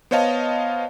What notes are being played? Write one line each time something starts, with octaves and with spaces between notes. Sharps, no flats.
B3 C5 C#5 D#5 F5 A5